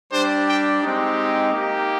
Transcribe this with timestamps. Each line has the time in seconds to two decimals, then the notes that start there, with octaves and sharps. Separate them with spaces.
0.12 G3 D4 G4 C5
0.48 G5
0.83 G#3 C4 D#4 G4
1.53 A#3 D#4 G4